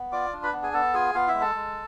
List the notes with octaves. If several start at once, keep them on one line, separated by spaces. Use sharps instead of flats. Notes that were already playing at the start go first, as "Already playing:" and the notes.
Already playing: B3
F4 D5 D6
D4
B4 B5
B3
G#4 G#5
B3 A4 A5
F4 G#4 G#5
B3 F4 F5
E4 E5
G#3
A4 A5
G#3